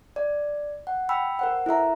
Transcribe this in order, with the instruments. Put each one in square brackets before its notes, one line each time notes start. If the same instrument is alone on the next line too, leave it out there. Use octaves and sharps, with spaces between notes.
[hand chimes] D5
F#5
G5 B5 E6
A#4 C5 F#5
E4 A4 E5 A#5